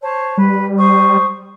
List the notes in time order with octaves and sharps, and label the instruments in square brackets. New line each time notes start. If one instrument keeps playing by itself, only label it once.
[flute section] C5 C#5 A5
[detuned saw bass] G3 [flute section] B4
[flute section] C5 C#6 D#6